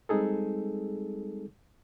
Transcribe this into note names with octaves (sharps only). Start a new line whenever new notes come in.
G3 G#3 C4 D#4 G#4 A4